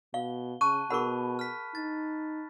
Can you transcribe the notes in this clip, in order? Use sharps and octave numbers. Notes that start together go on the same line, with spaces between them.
B2 F5 G7
C#3 A5 C#6 F#6 D#7
B2 G#4 A#4 F#5 B5 C#6
F6 B6
D#4 A6